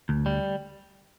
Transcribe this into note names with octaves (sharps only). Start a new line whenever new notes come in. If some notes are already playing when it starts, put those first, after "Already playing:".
D2
G3